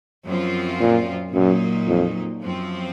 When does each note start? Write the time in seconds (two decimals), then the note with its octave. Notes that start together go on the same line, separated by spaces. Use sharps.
0.27 F#2 F3 C4 F4
0.80 A#2
1.34 F#2 A#2 F#3 A#3 D#4
1.88 F2
2.42 F#2 F3 C4